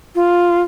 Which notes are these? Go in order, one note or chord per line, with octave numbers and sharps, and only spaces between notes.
F4